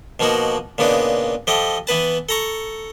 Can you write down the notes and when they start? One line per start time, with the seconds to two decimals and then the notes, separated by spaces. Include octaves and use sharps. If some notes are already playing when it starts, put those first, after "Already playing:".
0.20 B2 F3 A#3 D#4 F#4
0.78 A#2 C#3 B3 D4 D#4
1.47 F3 G4 A4 D#5
1.87 E3 B3 B4 A5
2.29 A4 A#5 C#6